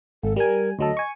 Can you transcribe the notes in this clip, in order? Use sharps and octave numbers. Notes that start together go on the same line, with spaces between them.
G#1 A4
G3 A#4 G#5
D2 F#3 A4 D#5
G#5 C#6